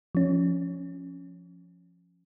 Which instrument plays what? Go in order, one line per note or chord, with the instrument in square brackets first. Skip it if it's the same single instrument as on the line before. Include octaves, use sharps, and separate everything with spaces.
[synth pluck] F3 C#4